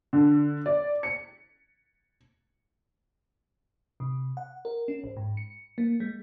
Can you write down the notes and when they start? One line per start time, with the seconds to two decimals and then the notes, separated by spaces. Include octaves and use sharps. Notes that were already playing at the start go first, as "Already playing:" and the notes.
0.13 D3
0.66 D5
1.03 C#7
4.00 C3
4.37 F#5
4.65 A#4
4.88 C#4
5.04 A1
5.17 G#2
5.37 C#7
5.78 A#3
6.00 G#3